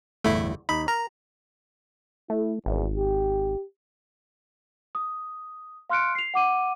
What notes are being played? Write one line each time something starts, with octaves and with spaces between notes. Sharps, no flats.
G1 E2 A2 A3 E4
D#2 D#4 B5
A#4 A#5
A3 E4
G#1 E2
G4
D#6
F5 C6 F6 F#6 C#7 D7
C7 F7
F#5 D6 D#7